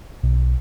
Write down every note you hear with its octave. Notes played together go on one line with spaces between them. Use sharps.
B1